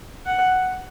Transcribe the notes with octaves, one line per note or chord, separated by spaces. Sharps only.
F#5